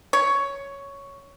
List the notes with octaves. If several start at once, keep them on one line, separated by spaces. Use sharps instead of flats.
C#5